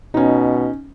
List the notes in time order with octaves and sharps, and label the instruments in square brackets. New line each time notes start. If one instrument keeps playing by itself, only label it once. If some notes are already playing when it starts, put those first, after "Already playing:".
[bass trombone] B2 [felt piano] C#4 D#4